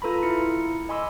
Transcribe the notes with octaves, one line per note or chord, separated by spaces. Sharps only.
F4 A4 B4 A#5 B5
E4 C#7
D#5 G#5 B5 C6 D6 E6